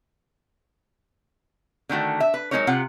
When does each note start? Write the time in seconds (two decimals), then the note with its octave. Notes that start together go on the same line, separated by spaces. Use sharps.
1.89 D3 D#3 A3 F#4
2.20 E5
2.34 B4
2.51 F#3 G#3 C#4 D#4 A#4 C#5
2.67 C3 F4 F#5